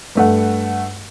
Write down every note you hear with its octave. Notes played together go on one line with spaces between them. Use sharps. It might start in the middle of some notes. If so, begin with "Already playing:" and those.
G2 A3 F#5